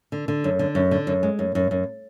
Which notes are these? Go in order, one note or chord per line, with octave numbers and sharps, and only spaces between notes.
D3
D3
F#2
D3
F#2
D3
F#2
G#3
F#2
F#2
F#2